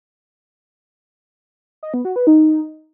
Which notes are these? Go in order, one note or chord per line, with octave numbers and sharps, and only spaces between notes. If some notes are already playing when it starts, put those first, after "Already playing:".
D#5
B3
F#4
B4
D#4